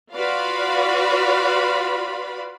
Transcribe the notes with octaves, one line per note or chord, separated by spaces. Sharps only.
F4 F#4 B4 D5 F5 B5